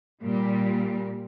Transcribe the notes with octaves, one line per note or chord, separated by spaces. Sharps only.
A#2 G3